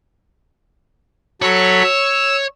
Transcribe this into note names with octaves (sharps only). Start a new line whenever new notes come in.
F#3 A4 C#5 B5
E6